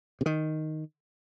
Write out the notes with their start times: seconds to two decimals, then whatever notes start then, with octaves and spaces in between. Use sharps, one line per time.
0.21 C3
0.26 D#3